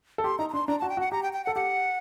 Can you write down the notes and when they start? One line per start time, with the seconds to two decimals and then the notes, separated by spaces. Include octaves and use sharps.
0.18 A4
0.24 G4 C6
0.38 D#4 A#5
0.49 A#5
0.54 D4 C6
0.67 D4 A#5
0.79 F#4 A5
0.89 G5
0.97 F#4
1.00 F#5
1.12 G4 A#5
1.23 G5
1.33 G5
1.44 F#5
1.47 A4
1.56 G4 F#5